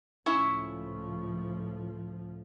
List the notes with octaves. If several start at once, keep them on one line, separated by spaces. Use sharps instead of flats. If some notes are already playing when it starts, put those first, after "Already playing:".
C#2 A2 F3 C#4 E4 E5